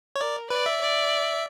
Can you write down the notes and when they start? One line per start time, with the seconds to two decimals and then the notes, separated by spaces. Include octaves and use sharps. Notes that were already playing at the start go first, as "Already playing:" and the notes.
0.16 C#5
0.20 A#4 D5
0.50 B4 D5
0.66 E5
0.81 D5